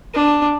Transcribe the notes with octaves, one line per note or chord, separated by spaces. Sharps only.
D4